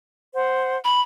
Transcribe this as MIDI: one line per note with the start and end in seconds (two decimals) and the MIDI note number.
0.35 0.77 72
0.35 0.77 78
0.84 1.01 83